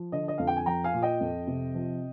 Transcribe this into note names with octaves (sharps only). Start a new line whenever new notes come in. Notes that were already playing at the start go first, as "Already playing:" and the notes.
Already playing: F3
D3 D#5
D#5
F2 F5
G5
G#5
F3 G5 A#5
F5 G#5
A#2
D#5 G5
F2
C3
F3